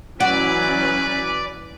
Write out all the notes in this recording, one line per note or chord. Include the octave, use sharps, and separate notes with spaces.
E3 F#3 C#4 F#4 B4 D5